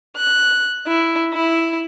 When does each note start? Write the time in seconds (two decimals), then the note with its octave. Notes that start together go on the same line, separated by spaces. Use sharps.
0.17 F#6
0.87 E4
1.34 E4